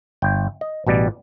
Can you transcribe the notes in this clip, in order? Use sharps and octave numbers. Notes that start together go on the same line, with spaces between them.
G1 G5
D#5
A1 B2 G3 D5